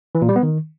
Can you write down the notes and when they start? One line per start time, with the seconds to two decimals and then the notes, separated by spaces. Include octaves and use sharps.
0.15 E3
0.22 A#2
0.29 G3
0.36 B3
0.43 D#3